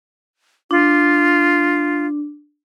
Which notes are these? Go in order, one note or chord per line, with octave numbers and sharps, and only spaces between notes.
D4 F4